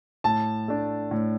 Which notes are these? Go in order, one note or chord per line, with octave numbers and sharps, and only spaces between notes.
A2 A5
A3 D4
A2